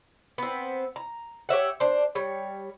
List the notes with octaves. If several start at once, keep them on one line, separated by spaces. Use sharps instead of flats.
B3 C4
A#5
G4 C#5 E5 F#5
D4 C5
G3 C#5